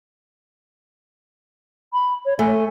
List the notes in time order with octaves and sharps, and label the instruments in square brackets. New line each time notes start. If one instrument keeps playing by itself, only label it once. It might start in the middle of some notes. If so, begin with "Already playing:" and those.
[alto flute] B5
C#5
[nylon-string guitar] A3 [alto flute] G#5